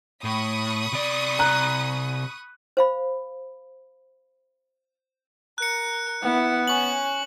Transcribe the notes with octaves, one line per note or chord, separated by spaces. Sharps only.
A2 B5 C#6 D#6
C3 D5
A#5 F#6
C5 F5 B5
A#4 F#6 C#7
B3 E4
C#4 G#5 C#6 F#7